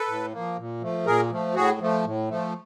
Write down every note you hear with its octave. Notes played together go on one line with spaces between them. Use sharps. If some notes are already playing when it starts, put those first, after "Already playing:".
Already playing: A4 B4
A2
F3 A#3
A#2
F3 A3
A#2 G#4 A#4
F3 A3
A2 F#4 G#4
F3 A3
A2
F3 A3